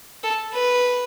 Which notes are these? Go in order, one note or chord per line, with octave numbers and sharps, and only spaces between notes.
A4
B4